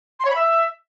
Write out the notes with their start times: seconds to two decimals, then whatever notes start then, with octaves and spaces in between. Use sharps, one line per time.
0.20 C6
0.25 C#5
0.30 B5
0.35 E5